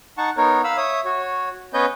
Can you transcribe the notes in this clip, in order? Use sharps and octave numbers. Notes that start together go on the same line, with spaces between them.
D#4 F#5 A5 C#6
B3 D#4 A#4 C#5
F5 B5 E6
C#5 E5 D#6
F#4 C#5
B3 C#4 B4 C#5 D#5 G6